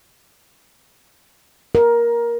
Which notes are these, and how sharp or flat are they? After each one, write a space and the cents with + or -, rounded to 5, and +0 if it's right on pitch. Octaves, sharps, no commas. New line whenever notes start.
A#4 +15